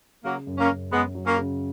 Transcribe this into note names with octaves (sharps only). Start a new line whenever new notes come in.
C#3 F#3 A#3
F#2
A#3 C#4
F#2
F#2 G#3 B3
F#3
A#3 C#4
C#3